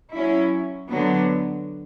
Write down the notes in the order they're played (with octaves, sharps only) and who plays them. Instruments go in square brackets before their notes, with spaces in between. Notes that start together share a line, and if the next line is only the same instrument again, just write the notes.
[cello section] F#3 C#4 E4
D3 F#3 B3